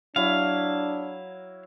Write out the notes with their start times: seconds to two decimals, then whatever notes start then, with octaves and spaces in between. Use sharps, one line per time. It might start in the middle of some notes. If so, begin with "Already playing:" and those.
0.16 F#3 D4 E4 F5